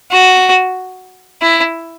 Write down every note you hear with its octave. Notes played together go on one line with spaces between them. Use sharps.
F#4
E4